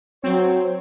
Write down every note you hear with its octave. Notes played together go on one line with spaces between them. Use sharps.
F#3 C4 C#5